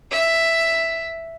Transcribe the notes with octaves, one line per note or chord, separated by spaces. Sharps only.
E5